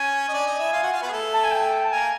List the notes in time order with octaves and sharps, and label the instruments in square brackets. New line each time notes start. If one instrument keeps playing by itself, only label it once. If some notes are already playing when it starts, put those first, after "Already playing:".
Already playing: [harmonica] C#4 [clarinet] G#5
[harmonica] D#5
D4 D5
D#4 D#5
E4 E5
F4 F5
F#4 F#5
F4 F5
B3 B4
G#4
A3 A4
[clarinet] A5
G#5
G5
A5
[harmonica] A#3 A#4 [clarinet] G#5